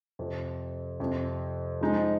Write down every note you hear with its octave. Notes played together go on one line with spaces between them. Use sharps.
F2 C3 F3
F2 C3 F3
F3 G#3 D#4